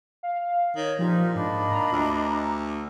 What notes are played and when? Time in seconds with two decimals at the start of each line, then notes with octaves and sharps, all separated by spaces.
0.23 F5
0.76 D#3 C#5
0.99 A#2 F3 D#4 F4 G4
1.35 G#2 D4 D#5 B5
1.71 A#5
1.92 D2